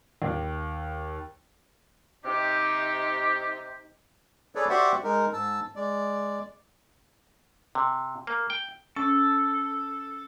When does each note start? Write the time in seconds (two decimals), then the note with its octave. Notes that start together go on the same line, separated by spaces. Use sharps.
0.22 D#2
2.25 C3 D#4 G4
4.55 G#4 A4 B4 C#5 D5
4.69 F#4 G4 C5 D5 E5 F#5
5.04 G#3 D#4 A#4
5.33 G#2 A5 E6
5.76 G#3 D5
7.75 C3
8.27 A#3
8.50 G5
8.96 C#4 A4